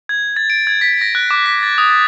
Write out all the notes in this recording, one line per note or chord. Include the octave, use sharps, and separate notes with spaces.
G#6
A6
D7
G#6
B6
A#6
F#6
D6
B6
A6
D#6
A6